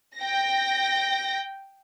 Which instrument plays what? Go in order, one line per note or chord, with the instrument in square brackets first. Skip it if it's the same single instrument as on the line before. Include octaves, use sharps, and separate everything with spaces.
[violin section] G5 A#6